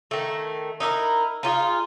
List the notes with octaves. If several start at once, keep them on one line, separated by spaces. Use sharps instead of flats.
D#3 A3
D#4 E4 G4 A#4
D#4 F4 G4 G#4